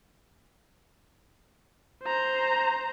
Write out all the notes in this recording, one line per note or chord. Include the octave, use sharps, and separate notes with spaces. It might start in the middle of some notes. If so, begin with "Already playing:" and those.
C5 A#5